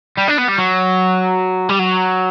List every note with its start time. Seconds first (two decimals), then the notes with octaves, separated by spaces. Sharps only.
0.17 G3
0.28 D4
0.38 B3
0.48 G3
0.58 F#3
1.69 G3
1.79 F#3